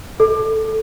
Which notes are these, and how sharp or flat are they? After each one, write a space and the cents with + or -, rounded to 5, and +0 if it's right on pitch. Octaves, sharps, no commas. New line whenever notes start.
A4 +0